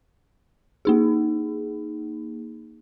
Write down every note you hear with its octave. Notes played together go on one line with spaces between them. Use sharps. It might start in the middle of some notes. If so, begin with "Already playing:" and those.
A#3 D#4 G#4